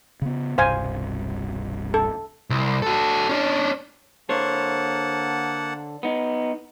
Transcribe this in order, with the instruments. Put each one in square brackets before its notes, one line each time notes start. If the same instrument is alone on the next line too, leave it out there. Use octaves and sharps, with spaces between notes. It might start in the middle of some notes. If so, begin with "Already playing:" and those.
[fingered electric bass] C#3 B3
[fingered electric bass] E1 C2 G2 [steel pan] C5 F5 G#5
[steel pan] A4
[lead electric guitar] C2
F#4 A4
C#4 D4
[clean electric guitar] D3 C5 C#5 [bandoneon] A#3 F#5 A5
[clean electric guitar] B3 D#4